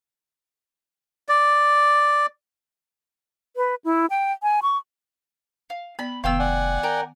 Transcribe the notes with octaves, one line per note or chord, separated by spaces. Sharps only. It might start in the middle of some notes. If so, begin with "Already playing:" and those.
D5
B4
E4
G5
G#5
C#6
F5
B3 D5 B5
F1 D#3 B3 F5 G5 E6
D5 F#5 G#5
A#4 G5